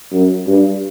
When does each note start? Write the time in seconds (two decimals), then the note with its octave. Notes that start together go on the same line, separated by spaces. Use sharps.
0.12 F#2
0.47 G2